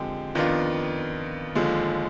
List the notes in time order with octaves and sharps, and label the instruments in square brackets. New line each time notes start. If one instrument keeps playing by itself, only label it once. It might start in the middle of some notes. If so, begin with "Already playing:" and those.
Already playing: [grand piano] D3 F3 G#3 C4 G4
F2 D#3 B3 D4 F4
D#2 D3 F3 G#3